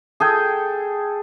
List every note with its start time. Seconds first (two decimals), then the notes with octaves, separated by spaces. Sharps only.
0.20 G#4 A4 G5